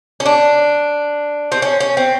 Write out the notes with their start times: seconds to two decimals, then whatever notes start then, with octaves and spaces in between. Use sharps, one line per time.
0.20 C#4
0.26 D4
1.52 C4
1.62 C#4
1.80 C#4
1.97 C4